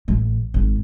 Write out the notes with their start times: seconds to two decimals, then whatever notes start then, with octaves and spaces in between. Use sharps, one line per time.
0.08 A1
0.54 G#1